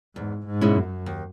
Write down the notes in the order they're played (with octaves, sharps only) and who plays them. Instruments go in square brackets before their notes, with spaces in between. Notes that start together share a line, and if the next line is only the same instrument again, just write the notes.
[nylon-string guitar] E2 [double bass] G#2
[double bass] G#2
[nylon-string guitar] B2 G#3 C#4 E4
[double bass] F#2
[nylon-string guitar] D#2